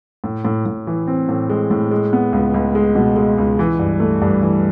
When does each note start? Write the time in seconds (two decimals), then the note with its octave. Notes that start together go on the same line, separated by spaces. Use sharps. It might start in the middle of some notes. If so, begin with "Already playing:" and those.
0.24 A2
0.45 A2
0.66 A2
0.87 E3
1.08 C4
1.29 A2
1.49 G#3
1.71 A2
1.91 G#3
2.13 B3
2.33 C#2
2.54 C#2
2.75 G#3
2.95 B2
3.16 G#3
3.38 C#2
3.59 E3
3.79 G2
4.00 A3
4.22 G2
4.42 E3